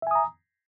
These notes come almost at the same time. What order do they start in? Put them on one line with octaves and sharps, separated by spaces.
E5 G#5 D#6 A#5